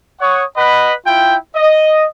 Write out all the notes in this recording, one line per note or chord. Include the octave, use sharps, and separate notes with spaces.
C#5 F#5 C#6 D#6
B4 D#5 F#5 B5
E4 F4 G5
D#5